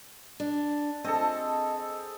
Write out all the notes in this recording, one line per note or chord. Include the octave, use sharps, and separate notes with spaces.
D4
C4 G#4 A4 D#5